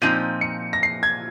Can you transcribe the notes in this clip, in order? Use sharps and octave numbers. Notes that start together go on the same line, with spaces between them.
A#2 F3 C4 D#4 D#7
C#7
A#6
C7
G#6